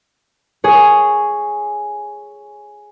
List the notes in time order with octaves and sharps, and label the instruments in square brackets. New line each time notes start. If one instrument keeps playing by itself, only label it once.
[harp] G#4 C#5